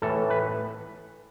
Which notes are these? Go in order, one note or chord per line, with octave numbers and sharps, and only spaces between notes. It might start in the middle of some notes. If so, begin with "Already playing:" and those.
A2 E3 A4
B4